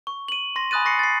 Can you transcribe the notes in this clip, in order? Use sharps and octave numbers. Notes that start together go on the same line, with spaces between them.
C#6
D#7 F#7
C6 A#6
G#5 B5 D#6 F#6 A6 D#7
C#6 A#6 C7 C#7
A6 C7